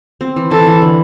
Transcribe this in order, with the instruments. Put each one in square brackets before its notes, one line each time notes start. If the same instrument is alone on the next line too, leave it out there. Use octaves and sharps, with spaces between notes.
[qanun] C4
E3
[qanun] E3 [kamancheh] A4
[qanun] E3
D3